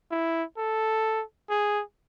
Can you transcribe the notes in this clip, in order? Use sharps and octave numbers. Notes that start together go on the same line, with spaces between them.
E4
A4
G#4